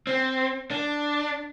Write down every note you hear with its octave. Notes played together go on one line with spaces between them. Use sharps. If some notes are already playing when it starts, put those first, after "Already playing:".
C4
D4